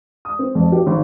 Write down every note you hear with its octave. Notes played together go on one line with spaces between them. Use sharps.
D#6
C4
F2
G4
G#1